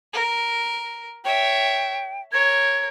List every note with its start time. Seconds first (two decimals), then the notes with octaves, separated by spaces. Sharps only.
0.13 A#4
1.25 C#5 E5 G5
2.32 A#4 C#5 G#6